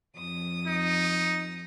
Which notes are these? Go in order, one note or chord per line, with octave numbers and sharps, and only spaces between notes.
F2 D#6
D#4